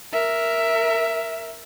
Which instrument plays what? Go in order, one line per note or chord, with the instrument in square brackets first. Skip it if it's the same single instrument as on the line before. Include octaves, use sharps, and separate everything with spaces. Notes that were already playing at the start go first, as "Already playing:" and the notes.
[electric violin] A#4 E5